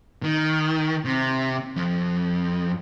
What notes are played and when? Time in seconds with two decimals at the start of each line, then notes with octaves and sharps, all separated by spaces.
0.23 D#3
1.05 C3
1.76 F2